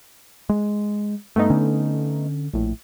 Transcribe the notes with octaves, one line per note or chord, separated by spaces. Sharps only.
G#3
G2 A3 B3 D#4
D3 C#4
A#1 A2